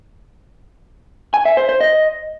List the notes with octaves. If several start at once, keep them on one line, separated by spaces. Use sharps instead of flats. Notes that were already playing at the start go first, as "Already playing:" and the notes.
G#5
E5
C5
C5
D#5